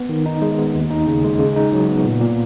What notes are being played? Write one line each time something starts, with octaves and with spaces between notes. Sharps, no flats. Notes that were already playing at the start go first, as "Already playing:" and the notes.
Already playing: B3
D#3
D#4
G#3
B3
D#2
D#4
C#3
G#3
C#3
D#4
F#3
B3
A#2
A#2